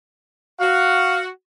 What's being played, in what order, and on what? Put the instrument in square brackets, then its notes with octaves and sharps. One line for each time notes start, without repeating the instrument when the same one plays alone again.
[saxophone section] F#4 [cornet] F5